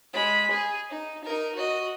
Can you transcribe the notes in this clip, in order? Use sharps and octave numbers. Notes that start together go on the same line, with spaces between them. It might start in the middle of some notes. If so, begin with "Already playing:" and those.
G#3 B5
G#4
D#4
D#4 A#4
F#4 D#5